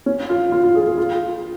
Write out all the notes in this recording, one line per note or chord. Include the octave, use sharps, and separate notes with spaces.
C#4
F4
F4
F4
G#4
G#4
F4